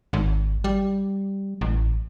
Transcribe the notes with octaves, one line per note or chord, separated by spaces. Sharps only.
G#1
G3
A1